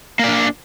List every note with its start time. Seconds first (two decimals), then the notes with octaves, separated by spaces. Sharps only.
0.19 A#3
0.24 D5
0.28 D4